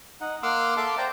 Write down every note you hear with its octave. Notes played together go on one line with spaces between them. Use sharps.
D#4 F#5
A#3 F#5 C6 D6 E6 F6
A4 E5 F5 A5 C6 D6
C5 D5 G5 A#5